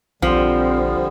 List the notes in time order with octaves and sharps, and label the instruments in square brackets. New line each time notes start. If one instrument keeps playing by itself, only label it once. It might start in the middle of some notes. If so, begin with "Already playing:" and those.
[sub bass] A#1 [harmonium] D3 G3 [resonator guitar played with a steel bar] F3 [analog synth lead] C4